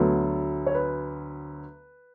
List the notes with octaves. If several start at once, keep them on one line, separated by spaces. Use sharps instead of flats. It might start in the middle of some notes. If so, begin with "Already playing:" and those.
Already playing: D2 D3 F#3 B3 A4
C#5
B4